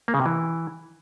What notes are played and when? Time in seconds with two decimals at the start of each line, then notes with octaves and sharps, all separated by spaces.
0.08 A#3
0.14 C#3
0.20 C3
0.26 E3